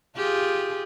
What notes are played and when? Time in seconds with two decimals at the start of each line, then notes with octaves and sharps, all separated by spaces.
0.16 F4 G4 G#4